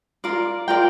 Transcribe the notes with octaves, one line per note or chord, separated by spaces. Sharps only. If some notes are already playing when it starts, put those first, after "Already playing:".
F4 A#4 D5
F4 A#4 D5 G5